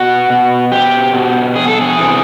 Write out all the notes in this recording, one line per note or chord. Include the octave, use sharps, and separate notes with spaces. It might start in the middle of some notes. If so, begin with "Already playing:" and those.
Already playing: B2 F#4
B2
G4
B2
G#4
A4
G#4
C3 E3